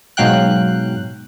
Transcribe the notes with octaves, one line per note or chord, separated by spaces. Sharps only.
G#2 B2 F#3 F5 G5 F#6